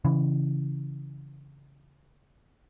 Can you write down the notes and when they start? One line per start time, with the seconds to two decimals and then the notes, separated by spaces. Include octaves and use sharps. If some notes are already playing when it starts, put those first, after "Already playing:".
0.05 C#3 E3